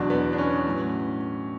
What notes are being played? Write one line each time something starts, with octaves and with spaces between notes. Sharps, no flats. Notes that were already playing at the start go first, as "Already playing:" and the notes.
Already playing: E2 B2 F#3 D4
B3
D4
C#4
A2 F#3